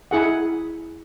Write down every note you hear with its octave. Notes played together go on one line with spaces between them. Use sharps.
E4 G#4 F#5